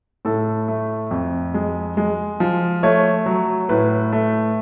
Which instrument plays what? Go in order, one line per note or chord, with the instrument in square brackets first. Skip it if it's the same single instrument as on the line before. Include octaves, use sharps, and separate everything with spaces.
[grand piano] A2 A4
A3
F2
G#3
G#3
F3
A3 C#5
F#3
A2 B4
A3